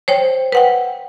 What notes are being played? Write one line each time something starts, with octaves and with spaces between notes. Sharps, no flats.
C5 C#5 G5
B4 F#5 G5